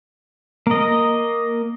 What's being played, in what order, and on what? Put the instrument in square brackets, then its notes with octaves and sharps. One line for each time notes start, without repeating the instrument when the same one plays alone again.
[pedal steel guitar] A#3 D#5